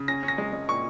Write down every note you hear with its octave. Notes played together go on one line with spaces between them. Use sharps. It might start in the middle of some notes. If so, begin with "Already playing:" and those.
Already playing: C#3
C#4 A#6
C#4
A#6
G#3
G#3
A#2 C#6